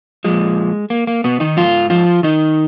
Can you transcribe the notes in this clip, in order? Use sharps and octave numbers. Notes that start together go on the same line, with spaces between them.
A#2 F3 G#3
A#3
A#3
B2 B3
D#3 D#4
G#2 F3 F4
F3 F4
D#3 D#4